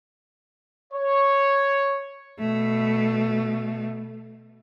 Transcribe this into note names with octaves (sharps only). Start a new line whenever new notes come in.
C#5
B2 A3